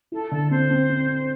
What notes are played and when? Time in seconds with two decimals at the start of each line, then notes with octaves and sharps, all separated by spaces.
0.12 E4 A4
0.31 D3 A4
0.50 C4 C5
0.70 C4
0.90 C4